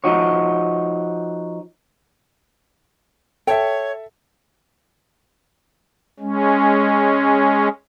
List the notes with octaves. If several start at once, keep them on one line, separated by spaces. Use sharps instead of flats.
F3 D#4 F#4 C#5
A4 C#5 E5 G5
G#3 C#4